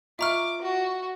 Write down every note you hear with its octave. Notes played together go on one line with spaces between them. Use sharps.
F4 D#5 E5 A#5 C#6 D6 F6
F#4